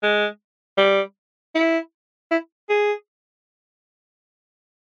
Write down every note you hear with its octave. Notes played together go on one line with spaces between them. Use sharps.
G#3
G3
E4
E4
G#4